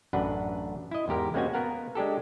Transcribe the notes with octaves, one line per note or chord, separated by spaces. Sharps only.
A1 F#2 D4 B4 F#5
E4 D#5
E2 G#2 G4 A#4
G#3 A#3 C4 C#4 F#4 G#5
B3 A#4 F5 F#5
G#3 D4 G4 A4